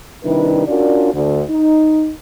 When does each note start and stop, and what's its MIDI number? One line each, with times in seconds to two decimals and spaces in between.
0.25 0.63 48
0.25 0.63 51
0.25 0.63 55
0.25 0.63 62
0.25 0.63 64
0.25 0.63 71
0.67 1.10 61
0.67 1.10 62
0.67 1.10 65
0.67 1.10 66
0.67 1.10 70
0.67 1.10 74
1.14 1.42 38
1.14 1.42 50
1.50 2.12 63